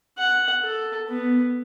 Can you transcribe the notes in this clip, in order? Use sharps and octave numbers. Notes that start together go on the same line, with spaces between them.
F#5
A4
B3